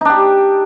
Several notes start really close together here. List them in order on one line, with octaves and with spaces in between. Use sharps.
D#4 D4 G4